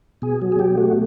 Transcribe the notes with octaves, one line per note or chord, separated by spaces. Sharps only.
B2 G#4
F#3
G#4
B2 G4
A3 F#4